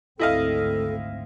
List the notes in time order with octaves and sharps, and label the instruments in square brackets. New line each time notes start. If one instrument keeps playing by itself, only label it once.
[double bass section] G#1 D2 C4 [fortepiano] E4 D#5 F5 [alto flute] A4